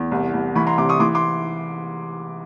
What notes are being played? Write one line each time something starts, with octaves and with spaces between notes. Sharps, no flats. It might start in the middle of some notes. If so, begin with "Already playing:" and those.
Already playing: E2
C2
C2
E3 B5 C#6
A#5 C6
C3 C6 D6
C#6 D#6
E3 C6 D6
C6 D6